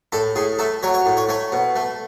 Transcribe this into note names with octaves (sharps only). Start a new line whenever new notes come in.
A2 A4
A2 G#4
A3 A4
F#3 C#5
C#5
A2
C#5
A3 C#5
B2
A3